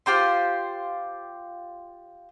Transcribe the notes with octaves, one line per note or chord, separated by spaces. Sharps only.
F4 G4 C5 C6